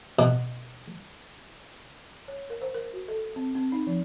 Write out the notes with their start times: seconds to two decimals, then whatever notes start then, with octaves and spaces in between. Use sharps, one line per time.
0.19 B2
2.28 C#5
2.50 A#4
2.62 C5
2.74 A#4
2.93 F#4
3.08 A4
3.36 C4
3.55 C4
3.72 D#4
3.87 F3